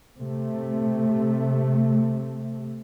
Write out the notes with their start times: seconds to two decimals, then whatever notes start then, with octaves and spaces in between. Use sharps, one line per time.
0.17 C3 A3